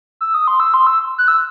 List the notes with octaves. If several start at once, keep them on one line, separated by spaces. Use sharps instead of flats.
E6
D#6
C6
E6
C6
E6
F#6
E6